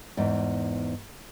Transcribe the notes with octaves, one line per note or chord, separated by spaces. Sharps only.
E2 G#2